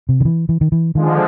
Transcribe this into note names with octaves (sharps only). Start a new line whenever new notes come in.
C3
D#3
E3
E3
D#3
E3
D3 D#3 F3 G#3